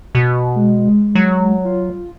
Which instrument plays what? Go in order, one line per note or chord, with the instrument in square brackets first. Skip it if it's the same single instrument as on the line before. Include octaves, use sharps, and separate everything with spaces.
[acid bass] B2
[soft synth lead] G#3
[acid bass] F#3
[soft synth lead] F4